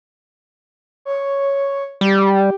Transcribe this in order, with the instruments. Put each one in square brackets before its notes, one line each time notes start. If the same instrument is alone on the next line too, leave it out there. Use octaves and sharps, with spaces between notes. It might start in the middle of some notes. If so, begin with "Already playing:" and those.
[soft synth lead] C#5
[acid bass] G3 [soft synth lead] G4